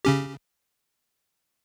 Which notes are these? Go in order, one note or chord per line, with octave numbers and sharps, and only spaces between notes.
C#3 C#4 G4